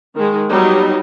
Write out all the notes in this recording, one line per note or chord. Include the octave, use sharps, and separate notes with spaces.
D#3 G#3
F#3 G3 B3 D#4